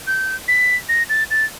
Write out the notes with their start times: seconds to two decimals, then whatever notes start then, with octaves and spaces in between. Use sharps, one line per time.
0.07 G6
0.48 B6
0.89 A#6
1.09 A6
1.31 A6